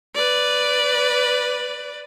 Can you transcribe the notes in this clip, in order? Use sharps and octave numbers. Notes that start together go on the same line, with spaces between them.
B4 D5